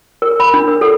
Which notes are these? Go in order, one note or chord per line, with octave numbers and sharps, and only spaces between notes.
A#4
B5
D4
A#4
A4